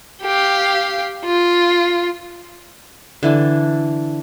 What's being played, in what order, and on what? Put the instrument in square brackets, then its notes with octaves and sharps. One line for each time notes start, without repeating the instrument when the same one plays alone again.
[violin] G4 F5
F4
[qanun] D3 E3 D4